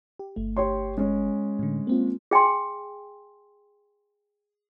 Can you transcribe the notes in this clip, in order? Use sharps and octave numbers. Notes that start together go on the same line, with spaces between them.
G4
G1 A3
G4 C#5 C6
G#3 C#4
A2 D3
A#3 C4 F4
G#4 G5 G#5 C6